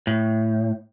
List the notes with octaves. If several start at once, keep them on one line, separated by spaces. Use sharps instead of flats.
A2